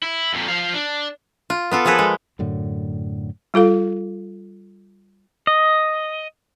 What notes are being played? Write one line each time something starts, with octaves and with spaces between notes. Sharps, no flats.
E4
F2 A#2
F3 F5
D4
F4
B3 F4 A4
F3 A#3 G#4 A4 B4
G#3
F#2 A2 D3
G3 F4 A4 F5
D#5